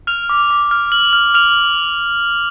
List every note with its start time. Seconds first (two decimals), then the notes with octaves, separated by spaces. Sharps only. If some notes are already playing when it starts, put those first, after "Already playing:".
0.07 F6 F7
0.29 D6
0.50 D6
0.71 F6
0.92 F6 F#7
1.13 F6
1.34 F6 F7